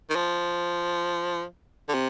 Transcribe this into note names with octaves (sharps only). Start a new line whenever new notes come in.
D#3
F3
D3
C3